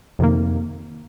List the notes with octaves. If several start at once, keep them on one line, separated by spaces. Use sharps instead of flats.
F2 C3 D#3 A#3